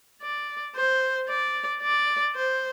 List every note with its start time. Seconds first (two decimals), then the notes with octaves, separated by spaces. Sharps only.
0.22 D5
0.76 C5
1.29 D5
1.82 D5
2.36 C5